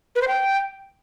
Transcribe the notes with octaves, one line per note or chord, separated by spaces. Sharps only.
B4
C5
G5